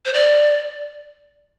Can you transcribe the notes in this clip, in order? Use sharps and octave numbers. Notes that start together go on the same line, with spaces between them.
C5
D5